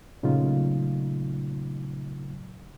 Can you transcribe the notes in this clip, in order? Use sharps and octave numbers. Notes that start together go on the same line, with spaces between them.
A#2 C#3 F#3 A3 D#4 F4